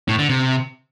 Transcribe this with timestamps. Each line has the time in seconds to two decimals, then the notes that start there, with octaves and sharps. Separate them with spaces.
0.08 A2
0.19 D3
0.29 C3